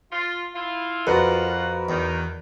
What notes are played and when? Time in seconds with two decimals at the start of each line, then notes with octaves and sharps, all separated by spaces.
0.12 F4
0.54 E4 F4
1.07 F2 F4 F#4 A#4 B4 F#5
1.89 E2 D#3